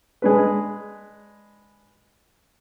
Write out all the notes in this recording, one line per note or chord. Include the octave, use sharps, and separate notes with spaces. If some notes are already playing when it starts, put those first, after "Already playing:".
G#3 D4 B4